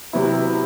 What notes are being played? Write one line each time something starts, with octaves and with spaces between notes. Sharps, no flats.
C3 F#3 B3 E4